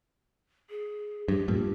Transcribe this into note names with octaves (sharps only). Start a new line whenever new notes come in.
G#4
G2 G4
G2 A#2